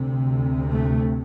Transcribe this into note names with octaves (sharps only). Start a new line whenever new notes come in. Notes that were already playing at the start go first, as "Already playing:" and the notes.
Already playing: D2 C3
A3